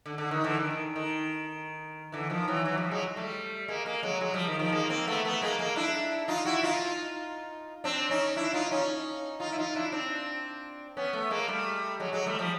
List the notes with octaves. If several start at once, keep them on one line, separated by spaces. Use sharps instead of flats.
D3
D3
D#3
D3 E3
D#3
D#3
D#3
D3 E3
D#3 F3
E3 F#3
E3 F#3
F3 G3
F#3 G#3
G3 A3
G#3 A#3
G#3 A#3
F#3 G#3
F#3 G#3
F3 G3
D#3
D#3 F3
G#3 A#3
A#3 C4
A3 B3
A3 B3
G#3 A#3
G#3 A#3
D4 E4
D#4 F4
E4 F#4
D#4 F4
C4 D4
C#4 D#4
D4 E4
D#4 F4
C#4 D#4
D#4 F4
E4
D#4 F4
D4 E4
C4 D4
B3 C#4
A3 B3
G#3 A#3
G3 A3
F#3 G#3
F#3 G#3
G3 A3
F3 G3